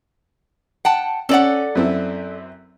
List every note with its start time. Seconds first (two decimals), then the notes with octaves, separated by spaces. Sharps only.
0.85 F#5 G5 A5
1.29 C#4 A4 D5 F#5
1.75 F#2 C4 E4